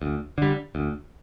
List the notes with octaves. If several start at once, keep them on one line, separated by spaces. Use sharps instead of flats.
D2
D3 G3
D2